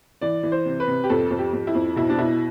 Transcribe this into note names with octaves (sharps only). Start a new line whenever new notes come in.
E3 D5
E3
C5
C3
B4
C3
G4
F2 A4
F2
G4
F2
E4
F2
B2 E4
D4
B2 E4